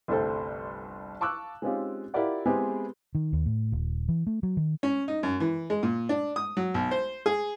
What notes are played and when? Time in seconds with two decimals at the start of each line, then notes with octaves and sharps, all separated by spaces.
0.08 G1 C2 A3 A4 C5
1.20 F5 A5 C#6 D6 E6 F#6
1.62 G#3 C4 C#4 D#4 F4 G4
2.14 E4 F4 G4 A#4 D5 F#5
2.46 G#3 B3 C4 E4 G4 G#4
3.15 D#3
3.33 D#2
3.46 A2
3.72 D#1
4.08 E3
4.27 A3
4.43 F#3
4.57 D#3
4.83 C#4
5.08 D#4
5.23 F#2
5.40 E3
5.70 G#3
5.83 A#2
6.09 D4
6.36 D#6
6.57 F#3
6.74 B1
6.91 C5
7.26 G#4